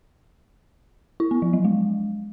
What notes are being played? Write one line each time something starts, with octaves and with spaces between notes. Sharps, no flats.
E4
B3
F3
F#3
G#3